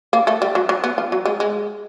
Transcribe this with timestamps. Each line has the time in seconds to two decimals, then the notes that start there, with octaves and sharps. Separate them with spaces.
0.13 A#3
0.27 A3
0.42 G3
0.55 F#3
0.69 F#3
0.84 B3
0.98 F3
1.12 F#3
1.25 G#3
1.40 G#3